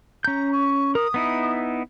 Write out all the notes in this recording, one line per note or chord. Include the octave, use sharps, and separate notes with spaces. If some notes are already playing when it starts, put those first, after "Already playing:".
C#4 A#5 G6
C#6
A#4 D#6
B3 D#4 E4